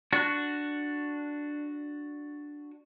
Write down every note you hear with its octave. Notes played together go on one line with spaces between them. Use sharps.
D4 F#4